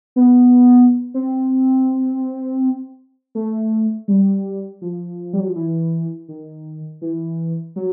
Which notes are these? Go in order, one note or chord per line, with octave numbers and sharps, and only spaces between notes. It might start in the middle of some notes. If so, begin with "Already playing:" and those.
B3
C4
A3
G3
F3
G3
F#3
F3
E3
D#3
E3
F#3